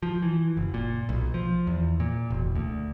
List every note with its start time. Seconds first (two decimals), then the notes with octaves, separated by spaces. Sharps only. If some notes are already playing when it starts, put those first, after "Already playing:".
0.03 F3
0.22 E3
0.57 F#1
0.74 A#2
1.09 B1
1.34 F3
1.67 E2
2.00 A#2
2.30 E1
2.55 D2